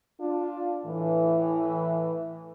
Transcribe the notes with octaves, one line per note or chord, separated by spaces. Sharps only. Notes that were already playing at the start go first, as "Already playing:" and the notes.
D4 F4
A2 E3